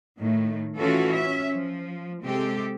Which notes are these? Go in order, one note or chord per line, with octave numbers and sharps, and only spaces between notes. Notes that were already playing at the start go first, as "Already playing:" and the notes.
A2 D#3 A3
E3 C#4 F4 F#4 A4
C#4 E5
F3
C3 G#3 C4 G4 A4